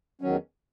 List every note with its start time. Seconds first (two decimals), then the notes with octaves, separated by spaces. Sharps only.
0.21 E2 D#3 F#3 C#4